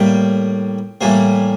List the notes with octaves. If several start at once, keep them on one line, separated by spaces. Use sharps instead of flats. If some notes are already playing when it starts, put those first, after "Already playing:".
Already playing: A2 G3 A#3 G5
A2 E3 G3 A#3